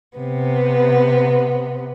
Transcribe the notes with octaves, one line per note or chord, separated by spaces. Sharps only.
C3 B3